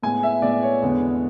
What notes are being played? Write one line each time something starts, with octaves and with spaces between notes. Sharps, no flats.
A2 G#3 B3 G#5
E5
A2 G#3 B3 D5
C#5
E2 D3 G#3 B3